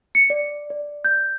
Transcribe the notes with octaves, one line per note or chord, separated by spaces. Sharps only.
C#7
D5
D5
G6